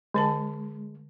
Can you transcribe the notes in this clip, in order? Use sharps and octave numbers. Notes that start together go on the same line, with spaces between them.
D3 G#3 C5 A5